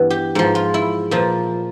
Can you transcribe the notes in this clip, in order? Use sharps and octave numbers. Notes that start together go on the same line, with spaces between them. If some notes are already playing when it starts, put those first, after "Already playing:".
Already playing: G2 E3 B3
G4
G#2 F3
F4
E4
A#2 F3